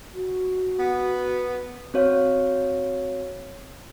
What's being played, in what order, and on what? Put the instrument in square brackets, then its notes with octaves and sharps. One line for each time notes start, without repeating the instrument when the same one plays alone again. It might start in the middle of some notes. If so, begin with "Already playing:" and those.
[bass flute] F#4
[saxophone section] B3
[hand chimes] C4 F#4 C#5 F5